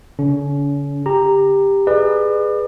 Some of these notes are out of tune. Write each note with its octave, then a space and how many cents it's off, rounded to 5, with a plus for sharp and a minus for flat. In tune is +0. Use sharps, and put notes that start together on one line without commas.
D3 -45 C#4 +40
G4 +10 A#5 +0
G#4 +0 B4 +0 D5 +40